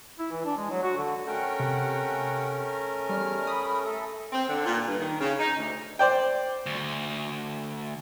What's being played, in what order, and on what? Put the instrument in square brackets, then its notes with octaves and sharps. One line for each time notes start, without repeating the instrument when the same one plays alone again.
[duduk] E4
E3
D4
G#3
F#3
F#4
D3
[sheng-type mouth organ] A3 C#4 A#4 [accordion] F#5 G5
[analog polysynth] C3
[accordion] E2 F6 [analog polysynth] G3
[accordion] B5 [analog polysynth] D#6
[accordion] A4 E5
[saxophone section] C4
D3
A#2
G2
D#3
C#3
D#4
D2
[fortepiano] C5 D5 G5
[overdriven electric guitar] D2